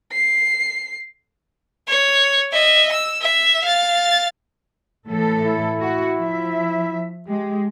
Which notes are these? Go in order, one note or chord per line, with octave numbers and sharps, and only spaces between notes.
C7
C#5
D#5 E5
E6
E5
F5 A6
A2 E3 A4
E4
F#4
F3 E5
G#3 G4